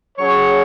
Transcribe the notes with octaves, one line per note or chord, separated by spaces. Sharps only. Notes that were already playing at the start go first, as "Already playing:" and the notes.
F#3 C#4 G#4 C#5